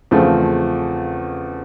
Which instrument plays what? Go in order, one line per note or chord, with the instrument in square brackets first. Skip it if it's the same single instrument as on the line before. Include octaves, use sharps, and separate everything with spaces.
[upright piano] E2 C#3 F3 A3 C4